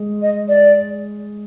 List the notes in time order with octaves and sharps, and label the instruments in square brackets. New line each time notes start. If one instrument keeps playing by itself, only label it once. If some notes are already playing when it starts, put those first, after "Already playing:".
Already playing: [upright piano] G#3
[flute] D#5
D5